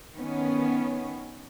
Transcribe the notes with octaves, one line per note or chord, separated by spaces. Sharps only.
D#3 B3 C#4